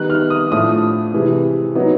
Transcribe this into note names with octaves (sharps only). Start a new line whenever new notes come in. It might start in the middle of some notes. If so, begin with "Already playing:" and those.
Already playing: D#3 G3 B3 D#4 F#6
F6
D#6
A2 F3 A3 D4 D#6
C3 E3 G#3
F#3 B3 D#4